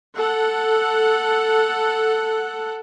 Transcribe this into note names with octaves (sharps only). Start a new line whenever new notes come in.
A4 F#5